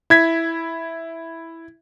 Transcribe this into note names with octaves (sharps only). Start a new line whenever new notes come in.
E4 G#6 B6